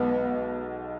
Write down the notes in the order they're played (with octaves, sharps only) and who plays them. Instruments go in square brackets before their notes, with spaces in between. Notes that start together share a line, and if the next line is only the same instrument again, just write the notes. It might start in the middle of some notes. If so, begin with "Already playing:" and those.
Already playing: [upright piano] B1 B2 G#3 [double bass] B3